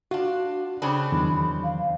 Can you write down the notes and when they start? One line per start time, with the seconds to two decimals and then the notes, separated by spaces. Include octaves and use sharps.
0.11 D4 F4 F#4
0.82 C#3 C4 D4 B5
1.12 E2 D#3 F#3
1.64 F5